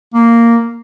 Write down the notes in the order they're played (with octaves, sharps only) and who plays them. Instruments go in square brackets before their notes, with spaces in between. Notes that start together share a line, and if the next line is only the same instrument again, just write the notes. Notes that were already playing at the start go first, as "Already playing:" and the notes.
[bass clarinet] A#3